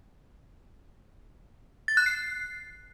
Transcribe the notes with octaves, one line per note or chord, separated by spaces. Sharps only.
A6
F#6
C7